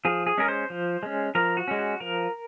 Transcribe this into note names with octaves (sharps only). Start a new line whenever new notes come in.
F3 G#4
G#4
G#3 C#4 A#4
C5
F3
G#3 C#4
F3 A#4
F#4
G#3 C#4
F#4
F3 A#4